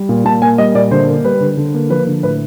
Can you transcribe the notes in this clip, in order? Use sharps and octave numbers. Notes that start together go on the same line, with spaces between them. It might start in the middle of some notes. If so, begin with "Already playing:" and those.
Already playing: G3
A#2
A#2 A5
A#3 G#5
G3 D#5
A#2 D5
D3 C5
A#3
G3 B4
D3
D3
A#3
F3 B4
D3
A2 B4